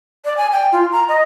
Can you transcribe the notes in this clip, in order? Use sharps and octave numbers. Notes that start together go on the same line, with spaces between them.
D5
G#5
G5
F4
A#5
D#5